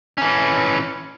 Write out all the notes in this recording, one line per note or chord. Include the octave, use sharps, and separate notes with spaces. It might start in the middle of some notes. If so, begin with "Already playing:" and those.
E3 C#4